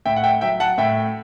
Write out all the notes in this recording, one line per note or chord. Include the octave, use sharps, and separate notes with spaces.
A2 E5 G5
F#5
E5 G5
F#3 E5 G5
F#5 A5
A2 E5 G5